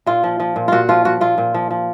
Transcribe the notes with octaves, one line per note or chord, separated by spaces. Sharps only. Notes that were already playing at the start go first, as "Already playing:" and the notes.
A#2 F4
F3
F3
A#2
A#2 F4 F#4
F3 F4
F3 F#4
A#2 F4
A#2
F3
F3